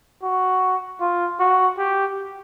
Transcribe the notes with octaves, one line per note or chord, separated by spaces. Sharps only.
F#4
F4
F#4
G4